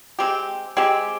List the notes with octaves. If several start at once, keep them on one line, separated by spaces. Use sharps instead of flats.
G#3 C4 G4
G#3 C4 G4